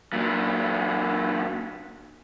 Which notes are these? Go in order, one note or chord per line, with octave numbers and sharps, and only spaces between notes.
A#2 F#3